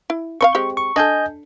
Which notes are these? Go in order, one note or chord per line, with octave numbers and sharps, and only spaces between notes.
E4
C4 C5 F5 C#6
G#3 C4 G4
C#6
D4 A4 D#5 G#5 G6